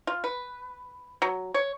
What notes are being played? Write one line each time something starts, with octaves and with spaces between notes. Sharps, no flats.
F4
B4
F#3
C#5